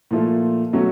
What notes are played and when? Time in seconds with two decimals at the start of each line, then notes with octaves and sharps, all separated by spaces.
0.11 A#2 F3 A3
0.73 B2 F#3 A3 C#4 F#4